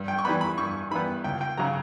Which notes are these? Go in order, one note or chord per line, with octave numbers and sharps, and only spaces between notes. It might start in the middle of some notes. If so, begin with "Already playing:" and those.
Already playing: G2
G5
C#6
E3 G3 B3 B5
B5
G2 C#6
E3 G3 B3 B5
C#2 G5
G5
C#3 F#3 A#5